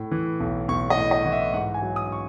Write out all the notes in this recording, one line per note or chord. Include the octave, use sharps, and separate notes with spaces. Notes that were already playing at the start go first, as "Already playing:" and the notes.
Already playing: A2
E3
B1
B1 C#6
D#5
A2
D#5
E3 F#5
E5
G#2 F#5
G#5
F#3
D#6
C#6